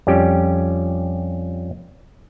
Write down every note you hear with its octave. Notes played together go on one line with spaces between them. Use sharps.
F2 G3 C#4 G4